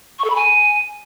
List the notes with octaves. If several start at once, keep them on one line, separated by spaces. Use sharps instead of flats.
C#6
A4
B5
G#5